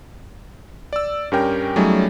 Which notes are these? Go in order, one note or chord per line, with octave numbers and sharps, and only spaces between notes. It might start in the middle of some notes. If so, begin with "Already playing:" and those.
D5 E6
G2 C#4 G4 A#4 G5
F#3 G3 A3 C#4 D#4 G#4